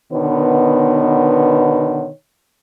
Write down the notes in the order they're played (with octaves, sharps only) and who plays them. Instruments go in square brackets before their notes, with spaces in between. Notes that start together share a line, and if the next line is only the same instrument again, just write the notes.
[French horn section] B2 D3 D#3 B3 C#5